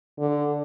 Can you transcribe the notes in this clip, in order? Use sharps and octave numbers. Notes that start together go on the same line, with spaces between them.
D3